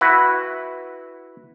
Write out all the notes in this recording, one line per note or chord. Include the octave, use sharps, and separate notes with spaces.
E4 F#4 B4